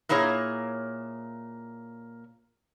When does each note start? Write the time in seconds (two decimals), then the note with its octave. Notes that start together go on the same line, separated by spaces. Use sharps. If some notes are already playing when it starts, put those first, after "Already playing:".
0.09 A#2 A#3 E4 G#4 C#5